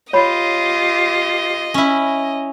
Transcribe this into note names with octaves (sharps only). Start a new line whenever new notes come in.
F4 G4 C#5 D#5 B5
C#4 E4